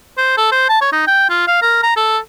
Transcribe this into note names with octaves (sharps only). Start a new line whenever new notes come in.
C5
A4
C5
A5
C#5
D#4
G5
F4
F5
A#4
A#5
A4